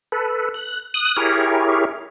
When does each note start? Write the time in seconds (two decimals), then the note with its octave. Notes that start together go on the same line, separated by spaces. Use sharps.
0.12 A4 B4
0.54 F#6
0.94 D#6 F#6
1.17 E4 G4 G#4 A#4 C#5